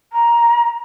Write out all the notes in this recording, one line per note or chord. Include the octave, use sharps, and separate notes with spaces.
A#5